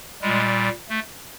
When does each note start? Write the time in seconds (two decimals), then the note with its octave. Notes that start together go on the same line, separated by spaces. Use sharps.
0.22 A#2 G3 G#3
0.89 A3